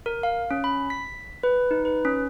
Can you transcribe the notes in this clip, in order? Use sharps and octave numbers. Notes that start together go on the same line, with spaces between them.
A#4
F5
C#4
B5
B6
B4
D#4
B4
C#4